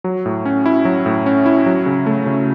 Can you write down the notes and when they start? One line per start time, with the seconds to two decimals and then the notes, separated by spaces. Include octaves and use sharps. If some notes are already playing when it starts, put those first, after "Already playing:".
0.04 F#3
0.26 A2
0.45 C#4
0.66 E4
0.85 F#3
1.06 A2
1.26 C#4
1.46 E4
1.66 F#3
1.86 C#3
2.06 A3
2.26 C#3